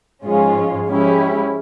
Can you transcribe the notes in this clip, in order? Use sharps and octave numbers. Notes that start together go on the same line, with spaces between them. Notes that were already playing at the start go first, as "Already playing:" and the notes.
G#2 F3 G#3 C#4 F4
F3 G#3 C#4 E4 G4